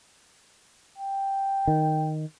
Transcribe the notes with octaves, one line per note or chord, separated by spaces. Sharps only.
G5
D#3